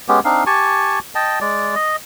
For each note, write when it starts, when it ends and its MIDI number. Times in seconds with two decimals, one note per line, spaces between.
0.08 0.20 56
0.08 0.20 59
0.08 0.20 61
0.08 0.20 67
0.25 0.44 60
0.25 0.44 62
0.25 0.44 63
0.25 0.44 77
0.46 0.99 67
0.46 0.99 80
0.46 0.99 81
0.46 0.99 85
1.15 1.39 75
1.15 1.39 79
1.15 1.39 81
1.41 1.75 56
1.41 1.75 74
1.75 1.96 75